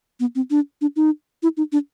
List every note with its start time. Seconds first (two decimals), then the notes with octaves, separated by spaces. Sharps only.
0.20 B3
0.35 C4
0.50 D4
0.81 D4
0.96 D#4
1.43 E4
1.57 D#4
1.72 D4